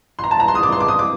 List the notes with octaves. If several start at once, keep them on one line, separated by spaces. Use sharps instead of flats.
C6
A#5
A5
A#5
C6
D#6
D6
C6
D6
D#6
D6